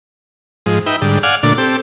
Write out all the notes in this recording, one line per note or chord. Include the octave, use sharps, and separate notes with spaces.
G#2 F3 G#3
D#4 B4 E5 G5
G#2 D3 G3
D5 F5 F#5 G#5 F6
A#2 D3 A3 D4
C4 G4 A4